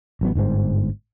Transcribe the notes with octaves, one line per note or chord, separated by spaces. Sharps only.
A1 F#3 B3
G1 G#2 C#3 C4